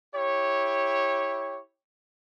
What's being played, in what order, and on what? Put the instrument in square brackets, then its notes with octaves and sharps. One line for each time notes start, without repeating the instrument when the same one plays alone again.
[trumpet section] E4 G4 C#5